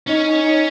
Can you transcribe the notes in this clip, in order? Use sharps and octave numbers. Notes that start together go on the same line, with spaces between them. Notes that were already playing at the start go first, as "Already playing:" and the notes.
C#4 D#4
D#4
D#4